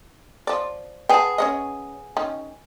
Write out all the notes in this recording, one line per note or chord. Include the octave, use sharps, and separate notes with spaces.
F3 D5
B3 G#4 G5 A5
C#4 C#5 D#5
D#3 C#4